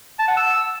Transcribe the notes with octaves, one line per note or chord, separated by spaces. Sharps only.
A5
F#5
E6